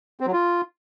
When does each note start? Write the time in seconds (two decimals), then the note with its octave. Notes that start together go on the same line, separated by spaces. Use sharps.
0.20 C4
0.27 F#3
0.33 F4